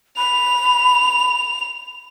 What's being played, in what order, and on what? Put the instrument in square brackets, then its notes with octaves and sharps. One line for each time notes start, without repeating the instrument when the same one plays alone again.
[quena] B5 [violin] F7